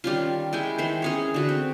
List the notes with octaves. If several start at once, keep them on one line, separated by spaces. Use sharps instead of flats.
D#3 G3 C#4 F4
G#3 E4 G5 G#5
D#3 E3 C5 C6
C#4 G#4 C#5
D3 F#4 B4
C4